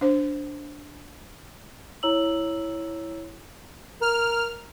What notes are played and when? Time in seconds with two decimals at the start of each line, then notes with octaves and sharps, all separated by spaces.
0.01 D4 C5
2.03 E4 C#5 A#5 E6 F#7
4.02 A#4 F6